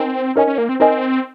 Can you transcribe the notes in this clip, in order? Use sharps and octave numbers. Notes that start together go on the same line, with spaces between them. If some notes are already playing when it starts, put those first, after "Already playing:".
Already playing: C4 D#4 A#4 D#5 G#5
C#4 D#4 A#4 D#5 G#5
C#4
A#3
C4
C4 D#4 A#4 D#5 G#5